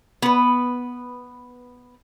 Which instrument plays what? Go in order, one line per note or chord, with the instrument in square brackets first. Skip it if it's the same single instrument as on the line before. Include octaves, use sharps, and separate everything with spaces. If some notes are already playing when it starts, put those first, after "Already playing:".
[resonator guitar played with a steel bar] B3 B4